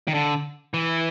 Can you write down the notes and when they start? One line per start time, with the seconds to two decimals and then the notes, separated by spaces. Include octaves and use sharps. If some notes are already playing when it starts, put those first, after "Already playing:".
0.08 D#3
0.14 D3
0.74 E3